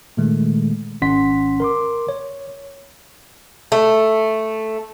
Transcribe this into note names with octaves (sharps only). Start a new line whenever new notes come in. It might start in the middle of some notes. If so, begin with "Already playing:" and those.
A#2 D#3 G#3 A3
G#1 C#4 D#5 F#5 C6 B6
A#4 C6 D6
C#5
A3